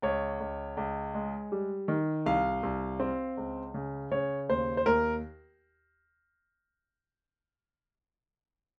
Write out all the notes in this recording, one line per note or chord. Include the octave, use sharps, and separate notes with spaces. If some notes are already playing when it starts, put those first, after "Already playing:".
C#2 C#5
C#2
C#2
G#3
G3
D#3
C2 F5
C2
C4
C#2
C#3
C#3 C#5
D#2 C5
C5
D#2 A#4